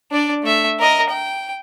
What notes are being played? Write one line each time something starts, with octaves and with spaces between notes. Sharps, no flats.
D4 D5
A3 E5
A#4 D#5
G5